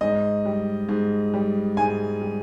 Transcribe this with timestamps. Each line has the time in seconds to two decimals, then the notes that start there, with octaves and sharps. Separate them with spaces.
0.01 G#2 D#5
0.45 G3
0.89 G#2
1.34 G3
1.77 G#2 G#5
2.22 G3